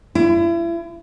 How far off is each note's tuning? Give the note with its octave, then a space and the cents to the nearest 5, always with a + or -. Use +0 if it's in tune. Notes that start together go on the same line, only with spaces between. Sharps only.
E4 +35